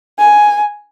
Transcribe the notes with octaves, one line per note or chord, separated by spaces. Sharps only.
G#5